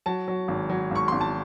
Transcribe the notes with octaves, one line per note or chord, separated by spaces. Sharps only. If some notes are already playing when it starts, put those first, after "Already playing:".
F#3 A5
F#3
G#1
F#3
G#1 C#6
G#1 C6
A5